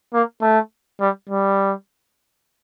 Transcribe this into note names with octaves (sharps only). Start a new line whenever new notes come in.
A#3
A3
G3
G3